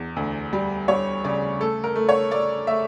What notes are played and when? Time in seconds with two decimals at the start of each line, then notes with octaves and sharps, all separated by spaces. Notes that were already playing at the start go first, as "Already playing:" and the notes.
Already playing: E2
0.16 D2
0.53 G3
0.88 G3 C#5
1.24 C#3 D5
1.60 A3 A4
1.84 A#4
1.96 A3
2.09 C#5
2.31 A3 D5
2.67 A3 E5